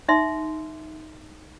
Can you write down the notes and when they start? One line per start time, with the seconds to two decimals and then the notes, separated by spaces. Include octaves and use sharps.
0.08 D#4 E5 C6